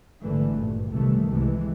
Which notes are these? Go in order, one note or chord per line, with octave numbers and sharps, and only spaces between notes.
G#1 D3 E3 A3
G2 A#2
C2 C3 D#3 E3 A3
C2 C3 E3 G#3